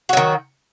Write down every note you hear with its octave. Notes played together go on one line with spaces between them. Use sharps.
D#3 F#3 F#4